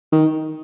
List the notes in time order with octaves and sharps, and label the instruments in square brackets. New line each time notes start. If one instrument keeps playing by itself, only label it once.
[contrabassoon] D#3